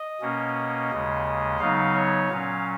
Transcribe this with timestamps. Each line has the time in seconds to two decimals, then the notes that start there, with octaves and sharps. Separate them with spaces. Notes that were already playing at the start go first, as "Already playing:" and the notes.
Already playing: D#5
0.21 B2 A#3 C#4
0.91 D#2 C#3 G#3
1.59 C#3 F#3 B3 D#4 F5
1.95 C#5
2.29 A#2 F#3 C#4 F5